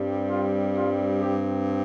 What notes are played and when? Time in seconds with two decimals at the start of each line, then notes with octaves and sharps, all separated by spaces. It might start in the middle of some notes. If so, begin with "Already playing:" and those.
Already playing: G2 G3 C4
0.30 F4
0.77 F4
1.21 G3 G4